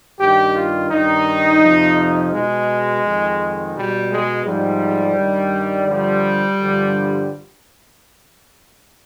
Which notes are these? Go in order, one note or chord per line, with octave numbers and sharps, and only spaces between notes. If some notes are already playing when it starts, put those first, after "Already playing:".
G2 D#3 G4
F4
G2 D#3 D#4
F2 C3 F3
B2 G#3
F2 D#3
B2 G3
G#3
G#2 F3 G3
G2 D#3
G2 D3 F3 G3
G2 D3 F3